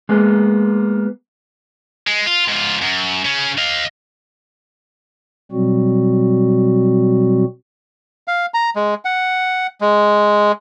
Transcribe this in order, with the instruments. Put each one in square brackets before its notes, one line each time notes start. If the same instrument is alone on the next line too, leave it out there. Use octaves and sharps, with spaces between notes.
[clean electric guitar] G#3 A#3 B3
[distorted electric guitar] G#3
F4
G#2 F4
F#2
C#3 C#4
D#5 F5
[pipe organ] B2 F#3 G3 C4 F#4
[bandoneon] F5
A#5
G#3
F#5
G#3